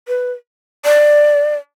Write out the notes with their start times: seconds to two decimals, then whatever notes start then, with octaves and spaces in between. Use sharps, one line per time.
0.08 B4
0.85 D5